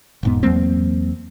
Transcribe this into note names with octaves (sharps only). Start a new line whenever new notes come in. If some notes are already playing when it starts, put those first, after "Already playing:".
E1 G#2 B3
E2 F#3 A#3 C4